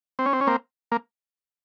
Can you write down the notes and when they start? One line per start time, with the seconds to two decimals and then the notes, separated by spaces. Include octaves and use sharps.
0.19 C4
0.26 C#4
0.33 C4
0.41 C#4
0.47 A#3 C4
0.92 A#3